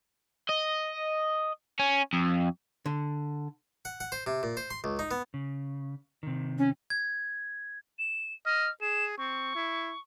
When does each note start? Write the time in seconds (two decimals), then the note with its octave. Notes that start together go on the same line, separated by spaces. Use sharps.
0.49 D#5
1.79 C#4
2.13 F2
2.86 D3
3.85 F#5
4.00 F#5
4.12 C5
4.27 C3
4.43 A#2
4.57 C5
4.71 C6
4.84 C#2
4.99 D#4
5.11 B3
5.34 C#3
6.23 C3 D#3
6.58 C#4
6.90 G#6
7.99 E7
8.46 D#5 F6
8.81 G#4 E7
9.18 C4 C#6
9.55 E4